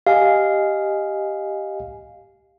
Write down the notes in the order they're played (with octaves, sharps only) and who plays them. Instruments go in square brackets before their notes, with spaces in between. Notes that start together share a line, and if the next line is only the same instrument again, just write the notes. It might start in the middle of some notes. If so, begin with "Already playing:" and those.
[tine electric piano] G4 D#5 G#5 [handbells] F5